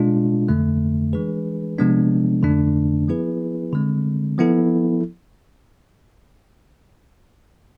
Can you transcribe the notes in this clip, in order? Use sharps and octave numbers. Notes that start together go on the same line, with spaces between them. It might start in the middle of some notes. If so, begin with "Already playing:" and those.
Already playing: B2 G#3 D4 F4
F2 D3 A3
E3 G#3 D4 G#4 B4
C3 F3 G#3 B3 D4
F2 D3 A3 D4
F3 B3 E4 G#4 B4
D3 G#3 C4
F3 B3 E4 A4